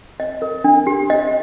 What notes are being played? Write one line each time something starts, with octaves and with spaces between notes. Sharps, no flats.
D#5
A#4
D4
G4
D#5